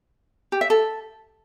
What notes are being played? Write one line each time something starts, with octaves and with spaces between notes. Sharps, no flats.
G4
E5
A4